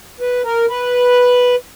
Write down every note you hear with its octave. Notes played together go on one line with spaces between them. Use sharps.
B4
A#4
B4